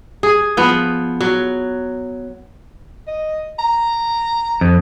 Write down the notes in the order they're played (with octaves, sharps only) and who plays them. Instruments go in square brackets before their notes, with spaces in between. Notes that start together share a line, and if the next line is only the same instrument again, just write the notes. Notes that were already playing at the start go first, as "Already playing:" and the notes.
[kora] G#4
F3 B3
F#3
[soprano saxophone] D#5
A#5
[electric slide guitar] F2